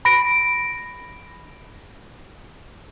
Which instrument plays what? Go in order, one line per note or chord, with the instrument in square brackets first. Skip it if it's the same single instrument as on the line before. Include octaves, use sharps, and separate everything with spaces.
[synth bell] B5 A#6 D7